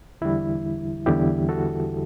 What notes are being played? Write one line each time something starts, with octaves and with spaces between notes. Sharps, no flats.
E2 D3 G3 E4
E2 D3 G3 E4 G4
F#4 A4